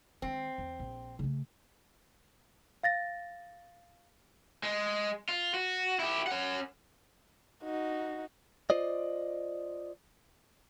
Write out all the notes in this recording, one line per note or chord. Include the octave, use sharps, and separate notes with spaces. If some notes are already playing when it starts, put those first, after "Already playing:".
D#3 G#3 C4
E2
A#1
C#3 A3
F5 A6 A#6
G#3
F4
F#4
E4 G4
C#4 F#5
D#4 F#4
F4 C5 D5 D#5